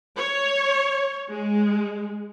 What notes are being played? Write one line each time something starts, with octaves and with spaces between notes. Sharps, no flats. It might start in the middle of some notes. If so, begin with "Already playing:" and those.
C#5
G#3